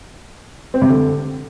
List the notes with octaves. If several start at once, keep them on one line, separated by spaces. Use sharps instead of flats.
C4
C3
D3